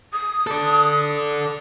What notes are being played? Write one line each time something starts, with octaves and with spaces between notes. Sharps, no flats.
D#6
A4 D5